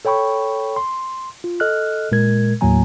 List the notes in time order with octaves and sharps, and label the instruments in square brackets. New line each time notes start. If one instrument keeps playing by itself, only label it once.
[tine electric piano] A4 C#5 G5 B5 C#6
C6
F4
A4 D#5 F6 F#6
A#2 G#3 A#4 G#6
D#2 A2 F#3 A#3 G#5 A#5